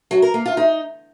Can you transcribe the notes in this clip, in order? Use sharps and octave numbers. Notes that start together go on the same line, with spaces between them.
F#3
A#4
A#3
F4
D#4